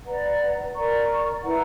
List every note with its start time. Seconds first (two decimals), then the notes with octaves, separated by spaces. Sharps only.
0.04 B4 D5 F#5 A#5
0.75 A#4 D5 A#5 C#6
1.44 E4 B4 F#5 A#5